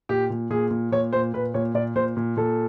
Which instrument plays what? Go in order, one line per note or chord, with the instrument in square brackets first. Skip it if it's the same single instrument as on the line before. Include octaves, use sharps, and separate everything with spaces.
[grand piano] A#2 G4
A#2
A#2 G#4
A#2
A#2 C#5
A#2 C5
A#2 B4
A#2 C#5
A#2 D5
A#2 C5
A#2
A#2 A4